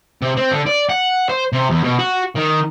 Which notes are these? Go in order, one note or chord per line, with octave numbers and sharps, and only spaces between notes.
C3
C4
D3
D5
F#5
C5
C3
E2
B2
F#4
D#3